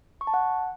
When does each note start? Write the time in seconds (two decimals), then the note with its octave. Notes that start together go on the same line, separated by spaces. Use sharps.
0.21 C#6
0.27 A5
0.34 F#5